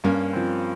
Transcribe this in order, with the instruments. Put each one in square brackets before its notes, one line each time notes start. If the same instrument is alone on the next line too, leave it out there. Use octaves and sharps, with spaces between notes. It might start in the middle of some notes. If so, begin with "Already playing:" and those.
[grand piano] G2 [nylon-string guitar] A#3 C#4
[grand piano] F3 C4